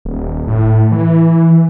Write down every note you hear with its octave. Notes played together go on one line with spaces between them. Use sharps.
D#1
A2
E3